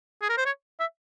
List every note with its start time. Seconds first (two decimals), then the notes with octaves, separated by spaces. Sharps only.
0.22 G#4
0.29 A#4
0.37 C5
0.46 C#5
0.80 E5